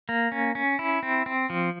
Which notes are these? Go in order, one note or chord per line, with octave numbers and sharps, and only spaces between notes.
A#3
C#4
C#4
E4
C4
C4
F3